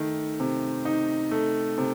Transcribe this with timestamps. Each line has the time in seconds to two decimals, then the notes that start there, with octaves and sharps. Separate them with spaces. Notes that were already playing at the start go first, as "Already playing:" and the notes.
Already playing: D#3 A3
0.40 C3
0.85 D#4
1.31 A3
1.78 C3